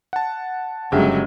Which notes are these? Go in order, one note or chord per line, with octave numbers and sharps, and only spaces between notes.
F#5 A5
G1 C#3 F#3 G#3 G4 G#4 E5